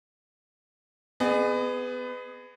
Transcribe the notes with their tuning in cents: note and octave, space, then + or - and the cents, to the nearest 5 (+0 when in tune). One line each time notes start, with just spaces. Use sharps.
B3 +25 G#4 +0 D#5 -40